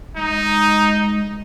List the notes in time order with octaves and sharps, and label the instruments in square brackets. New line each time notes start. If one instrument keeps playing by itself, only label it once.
[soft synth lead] G#3 [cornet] D#4